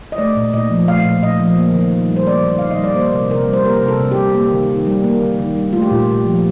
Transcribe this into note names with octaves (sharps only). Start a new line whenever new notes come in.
D#5
A3 D5
A#2
A#2 D#5
F3
A3 F5
A#2
A#2 D#5
F3
A#3
D#3
D#3
G3
C5
A#3 D5
D#3
D#3 F5
D#5
G3 D5
A#3 C5
C3
C3 A#4
G3
C5
A#3 A#4
C3
A4
C3
G4
G3
A#3
D#3
D#3
G3
A#3
D#3
D#3
G3
A3 F4
G4
A#2 F4
A#2
F3